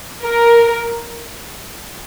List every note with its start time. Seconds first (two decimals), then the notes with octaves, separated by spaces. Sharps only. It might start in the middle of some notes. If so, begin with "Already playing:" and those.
0.23 A#4